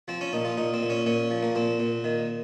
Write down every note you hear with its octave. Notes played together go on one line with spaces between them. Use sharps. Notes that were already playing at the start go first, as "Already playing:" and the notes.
F3 C4
C#4
A#2 D#4
F4
A#2 D#4
C4
A#2
C#4
A#2 C#4
F3
A#3
A#2 C4
A#2
D#3